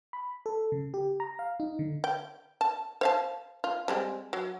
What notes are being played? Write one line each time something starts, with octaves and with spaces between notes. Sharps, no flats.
B5
A4
C#3
G4
A#5
F5
D#4
D3
G5
A5
C5 F5 A5
F4
G3 G#3 C4
F#3